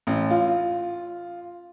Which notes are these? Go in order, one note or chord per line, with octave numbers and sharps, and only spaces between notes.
A1
F4